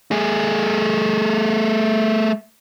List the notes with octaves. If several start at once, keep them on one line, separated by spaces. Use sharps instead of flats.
A3 G#4